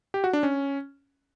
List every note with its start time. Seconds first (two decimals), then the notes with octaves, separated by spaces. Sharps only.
0.14 G4
0.24 F#4
0.33 D4
0.43 C#4